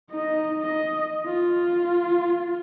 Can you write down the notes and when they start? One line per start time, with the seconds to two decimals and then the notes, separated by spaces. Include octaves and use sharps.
0.10 D#4 D#5
0.62 D#5
1.26 F4